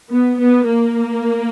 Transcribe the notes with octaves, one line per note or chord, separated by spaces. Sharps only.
B3
B3
A#3